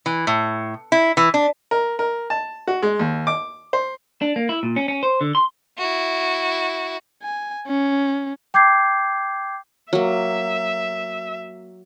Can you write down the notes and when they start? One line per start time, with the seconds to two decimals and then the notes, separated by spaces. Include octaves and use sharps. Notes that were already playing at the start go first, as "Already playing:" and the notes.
0.06 E3
0.27 A2
0.92 E4
1.17 E3
1.34 D4
1.71 A#4
1.99 A#4
2.30 A5
2.67 F#4
2.82 G#3
2.99 D#2
3.27 D6
3.73 C5
4.22 D4
4.36 A#3
4.49 E4
4.63 A#2
4.76 C#4
4.88 C#4
5.03 C5
5.21 D3
5.35 C6
5.78 E4 F#4
7.23 G#5
7.67 C#4
8.54 G5 D6 G6 G#6 C7
9.93 F#3 A#3 E5